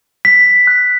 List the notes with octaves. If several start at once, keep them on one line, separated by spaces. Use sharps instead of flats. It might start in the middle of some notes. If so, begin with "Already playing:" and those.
B6
F#6